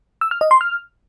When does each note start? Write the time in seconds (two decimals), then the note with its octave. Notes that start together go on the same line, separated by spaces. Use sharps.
0.21 E6
0.31 F6
0.41 D#5
0.51 C6
0.61 F6